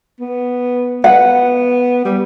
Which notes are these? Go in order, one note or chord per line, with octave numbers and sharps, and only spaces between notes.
B3
B3 F#5
G3